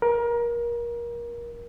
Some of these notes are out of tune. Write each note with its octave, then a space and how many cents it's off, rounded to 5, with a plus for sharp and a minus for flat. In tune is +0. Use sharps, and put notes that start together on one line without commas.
A#4 +25